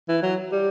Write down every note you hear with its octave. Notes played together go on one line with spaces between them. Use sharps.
E3
F#3
G3